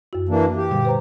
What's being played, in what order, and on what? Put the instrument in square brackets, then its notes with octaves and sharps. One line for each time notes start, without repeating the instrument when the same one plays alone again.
[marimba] F#2 F#4
[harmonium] E3 A#3 D4
G4
[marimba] A#2 D3 G3
B4 C5 A#5